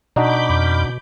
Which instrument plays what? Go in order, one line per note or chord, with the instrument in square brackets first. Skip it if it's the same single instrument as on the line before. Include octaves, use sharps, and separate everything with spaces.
[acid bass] B2 [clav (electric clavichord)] D4 D#4 F#4 [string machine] B5 D6 G6
[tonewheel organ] F2